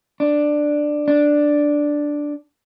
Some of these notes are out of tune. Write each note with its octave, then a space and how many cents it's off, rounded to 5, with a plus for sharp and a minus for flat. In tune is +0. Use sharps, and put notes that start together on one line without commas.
D4 +10
D4 +0